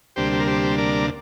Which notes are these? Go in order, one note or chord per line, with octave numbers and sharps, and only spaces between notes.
D2 C3 G3 A#3 D4 G4 C5
G4
A#4
G4 C5
A#4 D5